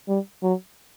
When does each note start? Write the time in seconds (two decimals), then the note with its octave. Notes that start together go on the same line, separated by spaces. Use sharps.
0.08 G3
0.43 F#3